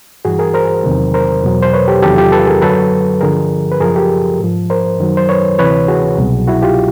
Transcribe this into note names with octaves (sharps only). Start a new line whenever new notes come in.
G2 E3 F#4 G#4
G#4 A#4
A#4 C5
E2 C3 D#3 F#3
A#4 C5
E2 B2 F#3
C5
B4 C#5
G4 A4
E2 C3 D#3 F#3 G4 A4
F4 G4
A4 B4
G#4 A#4
F#2 D3 F#3 A4 B4
G2 D3 F3 G#4 A#4
B4
F#2 C#3 F3 G#4 A#4
G4 A4
G#2 F3
A#4 C5
F#2 D#3 F#3
C5
B4 C#5
D2 C3 E3 B4 C#5
F#4 G#4
C2 B2 F#3
E4 F#4
F4 G4